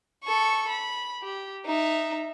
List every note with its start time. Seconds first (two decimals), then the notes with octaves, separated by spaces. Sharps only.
0.25 A4 C#6
0.69 B5
1.22 G4
1.66 D#4 E5